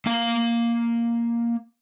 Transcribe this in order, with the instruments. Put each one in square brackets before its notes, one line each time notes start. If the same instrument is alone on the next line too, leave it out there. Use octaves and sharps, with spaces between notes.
[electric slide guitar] A#3 F5